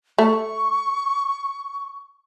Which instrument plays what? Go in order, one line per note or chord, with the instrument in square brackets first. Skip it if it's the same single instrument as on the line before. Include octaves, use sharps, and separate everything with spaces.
[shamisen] A3 [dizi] C#6